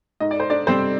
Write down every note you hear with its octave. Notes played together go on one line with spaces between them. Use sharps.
G#2 D#5
D5
C5
D4 D5
G3 C4 C5